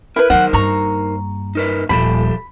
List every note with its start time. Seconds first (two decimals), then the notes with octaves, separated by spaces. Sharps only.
0.16 E4 A#4 B4
0.30 D#3 F#3 D#4 A#4 C5 F#5
0.53 G2 A#3 A#5 C#6
1.55 D#4 A#4 B4
1.89 D#1 F3 F4 G4 A4 B5